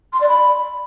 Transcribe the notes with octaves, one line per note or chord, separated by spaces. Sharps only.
C6
D5
B5